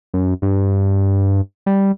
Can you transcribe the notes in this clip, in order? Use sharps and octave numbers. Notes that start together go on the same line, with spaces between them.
F#2
G2
G3